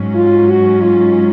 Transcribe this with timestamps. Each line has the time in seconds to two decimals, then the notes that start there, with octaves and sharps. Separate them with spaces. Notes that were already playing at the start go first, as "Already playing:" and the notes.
Already playing: G#2 F#3 C#4
0.15 F4
0.48 F#4
0.81 F4